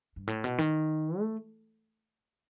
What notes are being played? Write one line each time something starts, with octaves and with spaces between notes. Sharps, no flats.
G2
A2
B2
D#3
A3